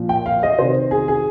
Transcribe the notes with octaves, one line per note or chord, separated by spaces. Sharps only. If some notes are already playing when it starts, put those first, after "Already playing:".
Already playing: A#2 F3
G5
F5
D#5
C3 D#3 C5
G#4
G#4